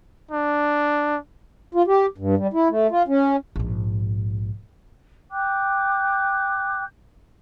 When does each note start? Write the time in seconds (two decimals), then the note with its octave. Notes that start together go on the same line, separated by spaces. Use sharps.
0.31 D4
1.75 F4
1.87 G4
2.18 G2
2.37 G3
2.54 E4
2.69 A3
2.91 F4
3.08 C#4
3.56 A#1 G#2
5.31 G5 D6 F#6 G6